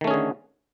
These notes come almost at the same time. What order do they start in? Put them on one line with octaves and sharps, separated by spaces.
D#3 A3 C#4 G#4 D3